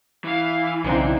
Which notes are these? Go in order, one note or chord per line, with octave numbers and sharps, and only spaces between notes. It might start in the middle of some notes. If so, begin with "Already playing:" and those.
E3 F5
B1 G#2 C#3 C4 D4 D#4